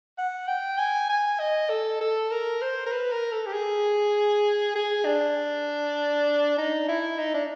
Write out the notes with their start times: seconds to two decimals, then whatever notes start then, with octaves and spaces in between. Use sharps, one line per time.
0.18 F#5
0.48 G5
0.78 G#5
1.09 G#5
1.39 D#5
1.69 A4
2.01 A4
2.31 A#4
2.62 C5
2.86 A#4
2.92 B4
3.12 A#4
3.32 A4
3.46 G4
3.53 G#4
4.75 G#4
5.05 D4
6.58 D#4
6.88 E4
7.18 D#4
7.34 D4